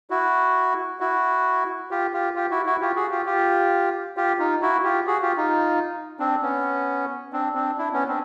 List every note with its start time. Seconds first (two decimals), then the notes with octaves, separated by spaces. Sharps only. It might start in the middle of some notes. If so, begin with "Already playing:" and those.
0.10 E4 F#4
1.00 E4 F#4
1.91 F4 G4
2.13 F4 G4
2.36 F4 G4
2.51 E4 F#4
2.66 E4 F#4
2.81 F4 G4
2.96 F#4 G#4
3.11 F4 G4
3.26 F4 G4
4.17 F4 G4
4.39 D#4 F4
4.62 E4 F#4
4.84 F4 G4
5.07 F#4 G#4
5.22 F4 G4
5.37 D#4 F4
6.19 C4 D4
6.42 B3 C#4
7.33 C4 D4
7.55 C4 D4
7.78 D4 E4
7.93 B3 C#4
8.08 C4 D4